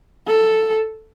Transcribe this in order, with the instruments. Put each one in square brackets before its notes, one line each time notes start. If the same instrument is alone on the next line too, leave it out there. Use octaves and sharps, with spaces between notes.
[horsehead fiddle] A4